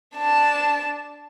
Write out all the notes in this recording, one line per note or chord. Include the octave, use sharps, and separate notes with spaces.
D4 A5